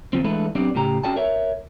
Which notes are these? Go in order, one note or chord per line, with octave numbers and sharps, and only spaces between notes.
D#2 F3 C4
E3 G#3 A3 D4 A4 B4
F#3 B3 C4 D4 G4 D5
A2 C#3 G4 A#5
C#4 F#4 G#4 D5 G5 A5
A#4 C#5 E5